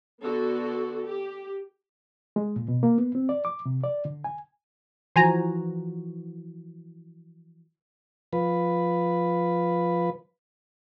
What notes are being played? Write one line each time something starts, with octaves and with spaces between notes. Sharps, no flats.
D3 B3 F#4 A4
G4
G#3
A#2
B2
A#3
B3
C4
D5
D6
C3
D5
D3
G#5
E3 F3 F#4 C5 G#5 A#5
F3 B4